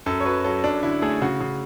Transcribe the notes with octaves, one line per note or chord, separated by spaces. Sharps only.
F#2 A4
C#5
F#3 B4
F#3 A4
F#2 D4
D3 E4
A3 G#4
C#3 F#4
C#3